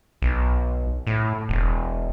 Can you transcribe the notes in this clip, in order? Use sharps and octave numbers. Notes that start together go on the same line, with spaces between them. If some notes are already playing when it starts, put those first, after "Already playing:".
B1
A2
E1